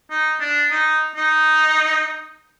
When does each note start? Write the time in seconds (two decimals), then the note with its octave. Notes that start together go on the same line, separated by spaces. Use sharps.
0.10 D#4
0.40 D4
0.71 D#4
1.16 D#4